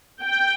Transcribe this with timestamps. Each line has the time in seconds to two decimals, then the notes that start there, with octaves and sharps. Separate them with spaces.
0.22 G5